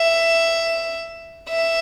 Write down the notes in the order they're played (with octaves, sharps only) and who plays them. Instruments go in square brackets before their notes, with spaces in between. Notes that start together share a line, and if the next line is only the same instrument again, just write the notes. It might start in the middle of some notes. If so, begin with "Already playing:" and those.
Already playing: [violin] E5
E5